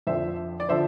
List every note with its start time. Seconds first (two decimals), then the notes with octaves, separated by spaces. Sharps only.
0.07 F2 D3 F3 C5 E5
0.60 D5
0.69 D3 F3 C5 E5